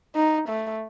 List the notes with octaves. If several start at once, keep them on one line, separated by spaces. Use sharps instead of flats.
D#4
A3